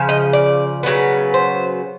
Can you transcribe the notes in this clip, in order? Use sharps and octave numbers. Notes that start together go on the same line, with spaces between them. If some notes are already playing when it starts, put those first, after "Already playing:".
Already playing: C#3 F3
D#5
D5
C#3 F#3 B3
C5